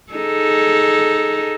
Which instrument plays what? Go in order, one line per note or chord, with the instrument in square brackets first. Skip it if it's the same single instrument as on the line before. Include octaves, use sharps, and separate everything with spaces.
[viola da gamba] D#4 G#4 A4